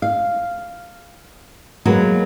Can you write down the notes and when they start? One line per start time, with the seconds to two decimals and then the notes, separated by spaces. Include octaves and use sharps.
0.02 F5
1.85 F#3 G#3 A#3 B3